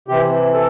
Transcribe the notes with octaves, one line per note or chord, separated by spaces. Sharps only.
C3 E3 G4
A4